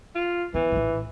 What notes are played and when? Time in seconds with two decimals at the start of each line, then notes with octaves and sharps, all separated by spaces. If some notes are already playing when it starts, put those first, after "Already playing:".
0.15 F4
0.54 E3 B3
0.72 A#1 A2